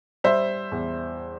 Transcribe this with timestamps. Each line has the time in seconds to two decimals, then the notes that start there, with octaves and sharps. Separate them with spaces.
0.24 G3 C5 E5
0.72 E2